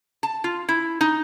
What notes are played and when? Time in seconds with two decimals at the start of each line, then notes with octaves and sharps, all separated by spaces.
0.23 A5
0.44 F4
0.69 E4
1.01 D#4